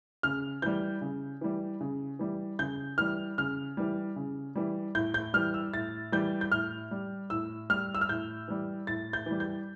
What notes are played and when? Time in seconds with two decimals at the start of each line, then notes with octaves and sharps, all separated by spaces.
0.23 C#3 F6
0.62 E3 G3 G6
1.01 C#3
1.41 E3 G3
1.81 C#3
2.19 E3 G3
2.59 C#3 G6
2.98 E3 G3 F6
3.38 C#3 F6
3.77 E3 G3
4.16 C#3
4.55 E3 G3
4.95 A2 G6
5.14 G6
5.33 E3 G3 F6
5.54 E6
5.73 A2 A6
6.12 E3 G3 G6
6.41 G6
6.52 A2 F6
6.91 G3
7.30 A2 E6
7.70 G3 F6
7.95 E6
8.01 F6
8.09 A2 G6
8.48 E3 G3
8.87 A2 A6
9.13 G6
9.26 E3 G3
9.40 G6